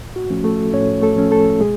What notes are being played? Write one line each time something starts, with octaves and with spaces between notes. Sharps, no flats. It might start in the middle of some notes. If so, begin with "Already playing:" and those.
Already playing: A2
F#4
F3 A3 C#4
A3 A4
A2 C#4 C#5
A3 A4
F3 A3 C#4
A3 A4
B2 G#3 G#4